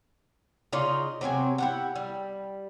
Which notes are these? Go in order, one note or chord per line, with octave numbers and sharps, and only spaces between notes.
C#3 D#4 F4 D5
C3 F#3 C4 G#5
E4 G4 F#5
G3